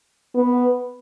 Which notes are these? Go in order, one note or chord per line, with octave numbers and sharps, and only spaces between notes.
B3